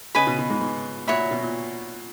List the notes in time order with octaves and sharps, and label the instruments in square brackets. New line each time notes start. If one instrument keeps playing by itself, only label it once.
[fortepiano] C#3 [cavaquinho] B4 D#5 G#5 B5
[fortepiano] B2
B2
G#2
G#2
[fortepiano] A#2 [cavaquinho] F#4 C#5 E5 B5
[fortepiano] A#2
B2
A#2